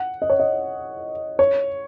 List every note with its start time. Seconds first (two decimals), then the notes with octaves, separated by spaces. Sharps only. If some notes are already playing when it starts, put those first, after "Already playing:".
Already playing: F#5
0.22 D#5
0.30 C#5
0.40 D#5
1.39 C#5